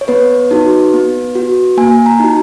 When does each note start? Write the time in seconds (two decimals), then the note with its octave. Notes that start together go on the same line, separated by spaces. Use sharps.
0.01 C#5
0.08 B3 B4
0.51 D#4 F#4
0.94 B3
1.35 F#4
1.77 A#3 G#5
2.06 A#5
2.20 D#4 F#4